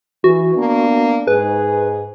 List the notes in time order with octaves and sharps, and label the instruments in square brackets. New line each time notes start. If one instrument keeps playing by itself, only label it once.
[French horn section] E3 [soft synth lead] F#4
[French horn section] A#3 B3 D4
[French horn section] G#2 G#4 [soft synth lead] B4